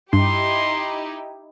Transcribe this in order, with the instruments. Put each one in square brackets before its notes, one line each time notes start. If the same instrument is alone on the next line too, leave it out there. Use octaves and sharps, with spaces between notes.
[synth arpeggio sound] G2 [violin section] D#4 E4 G4 [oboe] C6